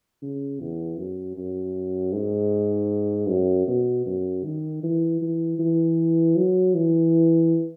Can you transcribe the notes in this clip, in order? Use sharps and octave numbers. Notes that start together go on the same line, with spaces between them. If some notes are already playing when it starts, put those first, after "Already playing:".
C#3
E2
F#2
F#2
G#2
F#2
B2
F#2
D#3
E3
E3
E3
F#3
E3